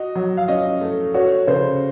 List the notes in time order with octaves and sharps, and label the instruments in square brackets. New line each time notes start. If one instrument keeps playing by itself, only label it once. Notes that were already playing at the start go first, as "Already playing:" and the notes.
Already playing: [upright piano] F#4 [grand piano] D#5
[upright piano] F#3
[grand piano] F5
[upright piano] C#4 [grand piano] D#5
[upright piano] A3
[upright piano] F#4 [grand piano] C#5
[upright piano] C#3 [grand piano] C5